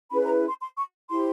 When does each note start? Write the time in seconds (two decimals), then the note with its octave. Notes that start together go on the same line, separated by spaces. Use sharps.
0.11 C#4 E4 G#4 B4 B5
0.24 A#5
0.48 C6
0.60 C6
0.77 C#6
1.10 E4 G4 C5 C6